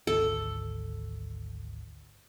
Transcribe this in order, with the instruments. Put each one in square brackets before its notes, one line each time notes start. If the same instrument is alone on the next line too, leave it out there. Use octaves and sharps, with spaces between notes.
[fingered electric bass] G#1 D2 [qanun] A4